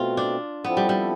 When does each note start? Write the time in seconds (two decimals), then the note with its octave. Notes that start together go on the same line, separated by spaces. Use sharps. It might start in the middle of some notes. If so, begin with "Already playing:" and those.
Already playing: B2 A3 C4 F4
0.17 D4
0.64 F3 B3 C4 E4 A4
0.77 G3
0.89 G3